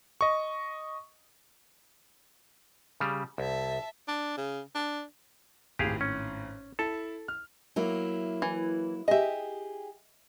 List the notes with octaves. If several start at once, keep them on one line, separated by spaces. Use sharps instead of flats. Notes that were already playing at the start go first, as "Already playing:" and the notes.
D#5 C#6
C#3 G3
C2 E5 A5
D4
C#3
D4
G#1 A2 G4 G#4 F5
C#4
E4 A4 A5
F6
F#3 A#3 E4
E3
G4 G#4 D#5 E5